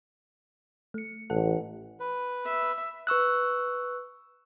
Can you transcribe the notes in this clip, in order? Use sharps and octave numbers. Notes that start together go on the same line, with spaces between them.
A3 C#7
A1 A4 F#5
B4
E5
B4 C#6 E6 F#6